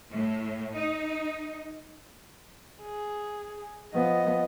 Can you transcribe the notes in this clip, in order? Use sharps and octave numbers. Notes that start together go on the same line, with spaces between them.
A2
D#4
G#4
F3 B3 D#5